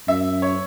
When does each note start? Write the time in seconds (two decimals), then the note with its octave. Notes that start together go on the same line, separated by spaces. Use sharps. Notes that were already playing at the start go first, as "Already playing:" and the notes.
0.08 F#2 E5
0.42 C#5